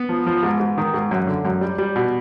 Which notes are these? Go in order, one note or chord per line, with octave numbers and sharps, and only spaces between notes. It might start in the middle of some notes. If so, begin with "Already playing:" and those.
Already playing: B3
F3
F3
G#2
G#2
D#3
G#2
F#2
D3
F#2
G3
G3
B2